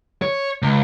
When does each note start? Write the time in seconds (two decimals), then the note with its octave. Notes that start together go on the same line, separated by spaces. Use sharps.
0.22 C#5
0.62 C#2